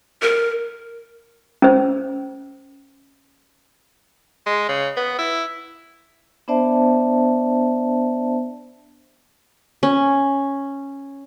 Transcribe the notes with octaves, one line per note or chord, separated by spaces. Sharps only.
A#4
C#4 C5
G#3
C#3
B3
E4
B3 D4 C5 D5 E5 A5
C#4